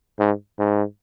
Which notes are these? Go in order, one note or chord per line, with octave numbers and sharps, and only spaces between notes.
G#2
G#2